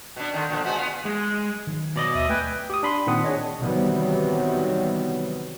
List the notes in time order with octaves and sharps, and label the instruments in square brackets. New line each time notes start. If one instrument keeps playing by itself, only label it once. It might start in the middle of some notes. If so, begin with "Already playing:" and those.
[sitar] B2 D4
D3 D#3
A#2 D3 F3
G#3 B3 F#4
B3 F4
[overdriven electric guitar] G#3
[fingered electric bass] D#3 F#3
[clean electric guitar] B2 D5 D#5
[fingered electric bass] D#2 [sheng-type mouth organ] E5 D#6
[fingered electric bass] A3 [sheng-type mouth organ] B4 G5 G#5
[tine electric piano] G4 D#6
D4 B5 C6
A#2 D#3 C4 F#5 D#6
D4 G#4 C#5 D#5
[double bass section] C3 D#3 E3 F#3 G3 B3